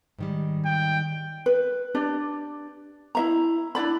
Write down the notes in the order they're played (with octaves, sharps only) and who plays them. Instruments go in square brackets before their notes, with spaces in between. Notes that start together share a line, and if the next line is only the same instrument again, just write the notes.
[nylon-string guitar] G#2 D#3 G3
[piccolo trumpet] G5
[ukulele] B4
D4 G4 D5
E4 E5 A#5
D4 E4 D5 B5